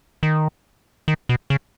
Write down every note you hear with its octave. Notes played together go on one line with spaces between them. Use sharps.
D#3
D#3
B2
C#3